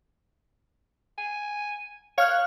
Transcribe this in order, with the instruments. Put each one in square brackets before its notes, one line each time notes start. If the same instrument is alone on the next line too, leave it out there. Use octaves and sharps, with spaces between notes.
[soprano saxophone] G#5
[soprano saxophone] C#5 [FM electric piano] F5 F6 F#6